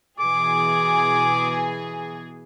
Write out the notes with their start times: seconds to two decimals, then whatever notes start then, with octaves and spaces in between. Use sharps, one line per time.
0.20 B2 E3 G#4 D6